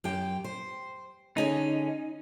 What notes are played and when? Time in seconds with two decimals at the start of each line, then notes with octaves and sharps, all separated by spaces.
0.04 F#2 G4 G5
0.44 C5
1.37 D3 C#4 D#4 G#4